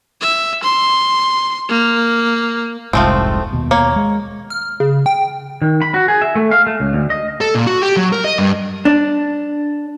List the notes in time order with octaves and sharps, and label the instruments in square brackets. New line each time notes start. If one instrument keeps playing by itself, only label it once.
[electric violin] E5
C6
A#3
[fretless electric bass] F1 C2 G#2 [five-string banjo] F3 A3 C4
[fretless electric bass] D#2 B2
[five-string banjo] A#3 C#5
[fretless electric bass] G#3
[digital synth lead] F6
C#3
G5
[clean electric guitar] D#3
B5
F#4
G#4
E5
A3
F5
A3
C#2
D2
D#5
[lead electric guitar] A4
A#2
F#4
G4
F#3
A#4
D#5
G2
[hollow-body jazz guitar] D4